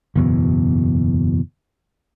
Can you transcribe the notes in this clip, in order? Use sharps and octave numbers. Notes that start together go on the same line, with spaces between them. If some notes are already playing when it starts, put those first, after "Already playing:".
F#1 E2 B2